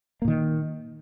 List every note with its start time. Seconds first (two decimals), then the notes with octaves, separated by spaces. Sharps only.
0.22 A#3
0.25 A#2
0.28 D#3